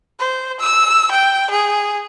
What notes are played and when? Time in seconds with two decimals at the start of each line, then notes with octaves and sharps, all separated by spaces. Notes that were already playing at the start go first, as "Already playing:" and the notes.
0.19 C5
0.60 E6
1.11 G5
1.50 G#4